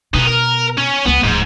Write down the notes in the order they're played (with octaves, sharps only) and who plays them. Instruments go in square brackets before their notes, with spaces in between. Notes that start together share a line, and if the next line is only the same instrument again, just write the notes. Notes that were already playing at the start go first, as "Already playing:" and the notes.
[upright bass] B2 [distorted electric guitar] D#4 B4
[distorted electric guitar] A#4
C#4
[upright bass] C#2 F4 [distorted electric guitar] B3
[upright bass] D1 F3 [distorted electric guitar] G#2